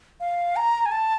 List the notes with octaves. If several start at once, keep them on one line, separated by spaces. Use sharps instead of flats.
F5
A#5
G#5
A5